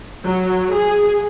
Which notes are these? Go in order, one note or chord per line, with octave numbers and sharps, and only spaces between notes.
F#3
G#4